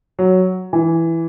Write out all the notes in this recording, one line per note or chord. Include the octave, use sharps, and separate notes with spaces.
F#3
E3